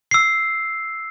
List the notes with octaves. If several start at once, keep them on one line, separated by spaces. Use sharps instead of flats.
E6 C7